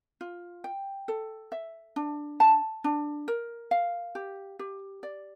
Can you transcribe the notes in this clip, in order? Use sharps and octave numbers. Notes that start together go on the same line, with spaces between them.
F4
G5
A4
E5
D4
A5
D4
A#4
F5
G4
G4
D5